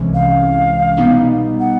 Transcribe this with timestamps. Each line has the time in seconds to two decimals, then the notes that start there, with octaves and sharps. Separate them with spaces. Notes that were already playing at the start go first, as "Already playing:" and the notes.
Already playing: C2 C3 E3 G#3 C#4
0.14 F5
0.97 B2 G3 B3 D#4
1.60 F#5